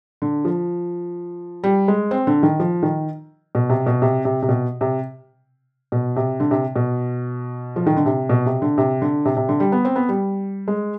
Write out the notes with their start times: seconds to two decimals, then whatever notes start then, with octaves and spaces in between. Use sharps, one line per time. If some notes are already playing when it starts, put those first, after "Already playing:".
0.22 D3
0.45 F3
1.64 G3
1.88 G#3
2.11 C4
2.27 D3
2.43 D#3
2.60 F3
2.83 D#3
3.55 B2
3.69 C3
3.86 B2
4.02 C3
4.25 C3
4.43 C3
4.49 B2
4.81 C3
5.92 B2
6.16 C3
6.40 D3
6.51 C3
6.76 B2
7.76 F3
7.87 D#3
7.96 D3
8.06 C3
8.29 B2
8.46 C3
8.62 D3
8.78 C3
9.02 D3
9.25 C3
9.37 C3
9.49 D3
9.60 G3
9.72 B3
9.85 C4
9.96 B3
10.09 G3
10.68 G#3